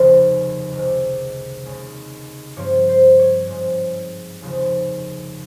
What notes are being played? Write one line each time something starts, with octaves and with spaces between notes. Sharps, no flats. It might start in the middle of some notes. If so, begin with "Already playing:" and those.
Already playing: F1 D#2 C#3 F3 C5
C#2 C3 D#3 A#3
D#2 C#3 G#3 C#4
G2 F3 C4 C#5
C5
C#5
G#2 F3 G#3 C4
F1 D#2 C#3 F3